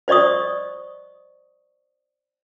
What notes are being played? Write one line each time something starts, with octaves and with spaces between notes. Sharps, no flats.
C5 D5 D#5 C#6 D#6